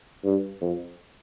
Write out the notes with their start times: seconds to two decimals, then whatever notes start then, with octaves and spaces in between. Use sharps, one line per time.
0.25 G2
0.61 F2